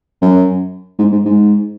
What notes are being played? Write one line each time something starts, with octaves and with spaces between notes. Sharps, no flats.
F#2
G#2
G#2
G#2